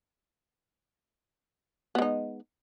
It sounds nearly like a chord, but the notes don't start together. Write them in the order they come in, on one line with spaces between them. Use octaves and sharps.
B3 G#3 D#4